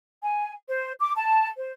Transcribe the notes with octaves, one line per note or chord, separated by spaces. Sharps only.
G#5
C5
D6
A5
C5